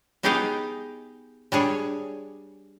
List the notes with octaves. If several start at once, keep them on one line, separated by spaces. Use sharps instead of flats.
B3 D#4 G4 G#4 F5 G5
G3 D4 G#4 C#5